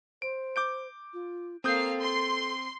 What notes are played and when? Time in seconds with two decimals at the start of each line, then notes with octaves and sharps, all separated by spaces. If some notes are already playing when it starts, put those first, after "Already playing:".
0.22 C5 D7
0.56 D6 G6 D7
1.13 F4
1.64 A#3 C4 A4 F5 D#6 G6 C7
2.01 C6